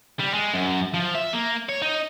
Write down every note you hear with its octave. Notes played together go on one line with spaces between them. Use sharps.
G3
G#3
F#2
F3
E5
A#3
C#5
D#4